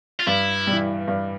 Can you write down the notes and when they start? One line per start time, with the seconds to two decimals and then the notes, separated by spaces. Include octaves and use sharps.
0.20 F4
0.27 G2 E4
0.67 E3 G3
1.08 G2